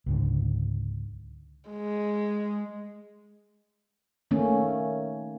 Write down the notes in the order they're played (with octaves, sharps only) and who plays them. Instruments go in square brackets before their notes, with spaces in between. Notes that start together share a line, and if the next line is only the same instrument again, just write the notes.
[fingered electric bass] C#2 G#2 D3
[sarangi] G#3
[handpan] D#3 A3 A#3 C#4